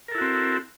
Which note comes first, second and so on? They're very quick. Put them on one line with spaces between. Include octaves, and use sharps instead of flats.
A#4 A4 E4 F#4 C4